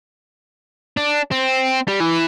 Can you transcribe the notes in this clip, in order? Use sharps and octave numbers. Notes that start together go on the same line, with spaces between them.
D4
C4
G3
E3